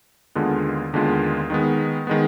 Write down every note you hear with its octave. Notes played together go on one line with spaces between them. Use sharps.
D#2 D3 G#3 B3 F4
D#2 D3 G#3 B3 F4
D#3 G#3 B3
D#3 G#3 B3